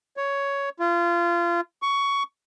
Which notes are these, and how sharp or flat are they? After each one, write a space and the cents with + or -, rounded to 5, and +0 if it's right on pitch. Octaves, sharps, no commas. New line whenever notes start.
C#5 +10
F4 -25
C#6 +15